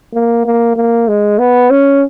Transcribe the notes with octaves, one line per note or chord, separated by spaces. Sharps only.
A#3
A#3
A#3
G#3
B3
C#4